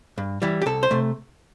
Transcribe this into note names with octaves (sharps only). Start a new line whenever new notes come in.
G2
E3 G3 E4
G4
C2 A4
C5
C3 A3